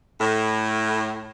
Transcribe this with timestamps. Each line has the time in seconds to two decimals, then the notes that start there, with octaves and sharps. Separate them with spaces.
0.20 A2